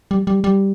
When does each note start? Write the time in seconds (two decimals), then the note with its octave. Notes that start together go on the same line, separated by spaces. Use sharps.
0.11 G3
0.27 G3
0.44 G3